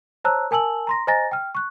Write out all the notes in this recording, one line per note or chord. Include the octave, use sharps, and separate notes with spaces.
C5 C#5 A5 A#5 E6 F#6
A#4 G#5 A5 E6 F#7
A#5 C6 A#6
C5 D#5 G#5 A#5 A6 A#6
G5 F6
C#6 F#6